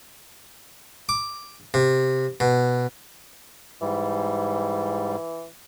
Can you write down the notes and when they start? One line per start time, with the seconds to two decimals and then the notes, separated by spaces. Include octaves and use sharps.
1.09 D6
1.74 C3
2.40 B2
3.81 G#2 E3 G3